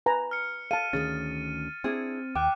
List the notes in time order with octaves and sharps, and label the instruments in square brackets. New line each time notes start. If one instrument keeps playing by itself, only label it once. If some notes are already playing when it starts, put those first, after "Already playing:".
[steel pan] B4 G#5 A#5
[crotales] F6 C#7
[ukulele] A4 [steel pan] F5 A5 [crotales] D#7
[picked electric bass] D2 D#3 C#4 [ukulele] G#4 [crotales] A6
[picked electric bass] C4 [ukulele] D4 E4 G#4
[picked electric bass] D#2 [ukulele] G5 [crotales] D6 F#6